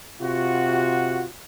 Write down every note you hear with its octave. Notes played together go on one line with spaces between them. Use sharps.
C3 F4 F#4